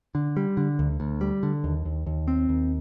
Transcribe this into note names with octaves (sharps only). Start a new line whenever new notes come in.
D3
G3
D3
D2
D2
G3
D3
D#2
D#2
D#2
C4
D#2